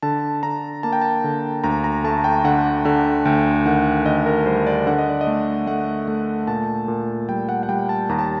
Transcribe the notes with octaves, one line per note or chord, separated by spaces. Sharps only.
D3 A5
D3 A#5
A#3 A5
G5
A5
D3
D2 A#5
A#5
A3 A5
G5
D3 F#5
D3 F#5
D2 G5
D#3 F#5
D2 D#5
A#4
G3 C5
D5
D3 F#5
D#5
D5
D#5
A3
A3 F#5
A3
A#2 A5
A#2
G3 G5
F#5
F#5
G3 G5
A5
D#2 A#5
A5